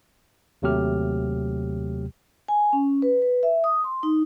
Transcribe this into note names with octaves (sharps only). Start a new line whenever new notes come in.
D#2 C3 F#3 A3 G4 F6
G#5
C#4
B4
B4
E5
D#6
C6
D#4